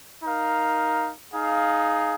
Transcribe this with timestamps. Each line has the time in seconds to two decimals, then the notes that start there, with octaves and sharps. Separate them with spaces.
0.23 D#4 A#4 F5
1.33 D#4 G#4 F5